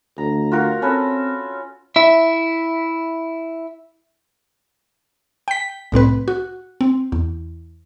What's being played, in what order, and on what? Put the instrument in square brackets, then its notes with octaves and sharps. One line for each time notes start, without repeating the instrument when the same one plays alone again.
[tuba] D2 [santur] A#5
[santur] F4 F#4 A#4
[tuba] C4 [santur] C#4 A4 B4
[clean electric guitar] E4 E5
[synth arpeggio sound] G5 B6
C2 A2 C4 B4
F#4
C4
E2